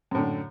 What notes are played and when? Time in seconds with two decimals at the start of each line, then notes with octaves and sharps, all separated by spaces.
0.11 F#2
0.15 A2
0.18 D3